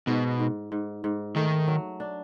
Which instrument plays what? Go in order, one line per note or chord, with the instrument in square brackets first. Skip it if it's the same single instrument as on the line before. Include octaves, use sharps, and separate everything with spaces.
[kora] G#2 [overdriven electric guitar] B2
[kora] G#2
G#2
G#2
[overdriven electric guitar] D#3 [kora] A3
[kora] F#3
D4